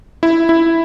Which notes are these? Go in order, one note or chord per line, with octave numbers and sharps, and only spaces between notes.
E4
E4